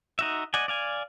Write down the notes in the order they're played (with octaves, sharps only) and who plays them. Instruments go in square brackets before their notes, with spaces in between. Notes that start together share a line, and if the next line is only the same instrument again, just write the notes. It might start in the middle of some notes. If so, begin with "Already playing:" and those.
[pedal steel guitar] D#4 F#4 E5
D5 D#5 F#5 G#5
D5 F5 G#5